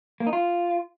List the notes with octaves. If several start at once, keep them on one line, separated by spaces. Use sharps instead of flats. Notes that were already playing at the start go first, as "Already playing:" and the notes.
A#3
D#4
F4